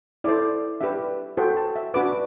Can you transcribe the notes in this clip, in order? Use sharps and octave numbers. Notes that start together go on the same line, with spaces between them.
E4 A4 C5 D5
D4 G4 B4 E5
F#4 A4 C5 G5
A5
E5
D4 F#4 B4 D6